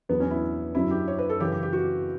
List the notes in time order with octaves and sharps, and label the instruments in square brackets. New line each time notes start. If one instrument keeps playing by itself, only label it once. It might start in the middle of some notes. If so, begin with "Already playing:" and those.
[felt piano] E2 D3 F#3 B3
C#4
E4
F#2 D3 F#3 E4
G4
C#5
B4
A4
F#2 C#3 E3 G4
G4
G4
F#4